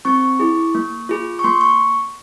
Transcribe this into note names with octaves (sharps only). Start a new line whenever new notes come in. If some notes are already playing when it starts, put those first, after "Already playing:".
C4 C#6
E4 G#4
A#3
F4 G#4
C#6
A#3 C6
C#6